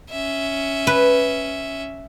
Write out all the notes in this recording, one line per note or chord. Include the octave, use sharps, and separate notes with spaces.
C#4 E5
B4